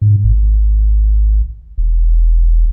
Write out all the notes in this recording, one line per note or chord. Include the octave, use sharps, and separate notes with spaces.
G#2
G#1
E1